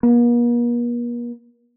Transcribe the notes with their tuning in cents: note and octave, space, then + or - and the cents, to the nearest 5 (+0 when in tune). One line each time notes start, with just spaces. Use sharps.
A#3 +45